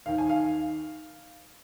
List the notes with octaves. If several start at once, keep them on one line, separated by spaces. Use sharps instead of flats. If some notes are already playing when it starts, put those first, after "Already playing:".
D#2 D#3 F5
G#5
F5